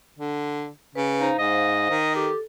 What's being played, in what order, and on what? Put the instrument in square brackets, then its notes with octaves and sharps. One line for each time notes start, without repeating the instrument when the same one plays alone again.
[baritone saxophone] D3
[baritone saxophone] C#3 [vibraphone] B4
[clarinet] D#4 [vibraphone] C5 F5
[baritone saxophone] G#2 [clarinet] D#5
[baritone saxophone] D#3
[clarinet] G4 [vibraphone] A4